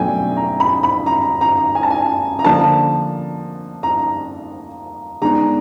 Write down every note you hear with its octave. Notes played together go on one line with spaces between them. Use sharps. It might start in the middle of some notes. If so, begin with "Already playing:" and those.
Already playing: B2 F#3 A3 D4 G5 G#5
A#5
B5
B5
A#5
A#5
G#5
A5
G#5
A#5
D3 F3 A#3 D4 A5
A#5
D#3 G#3 B3 D4 A#5